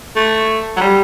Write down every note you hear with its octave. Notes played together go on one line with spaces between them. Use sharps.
A3
F#3
G3